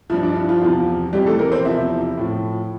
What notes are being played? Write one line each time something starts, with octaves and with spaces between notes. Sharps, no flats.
G2 F3 E4
D4
E4
F3 F4
E2 C3 F3
F2 E3 G3 G4
A3 A4
A#3 A#4
C4 C5
E2 C3 F3 E4 E5
A2 F3